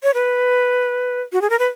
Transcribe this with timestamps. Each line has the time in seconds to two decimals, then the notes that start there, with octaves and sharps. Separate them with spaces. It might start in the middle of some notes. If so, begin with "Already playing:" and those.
0.04 C#5
0.14 B4
1.33 F#4
1.41 G#4
1.50 A#4
1.59 B4